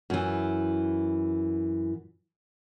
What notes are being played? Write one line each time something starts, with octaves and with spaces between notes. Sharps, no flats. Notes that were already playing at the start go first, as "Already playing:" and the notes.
F#2 E3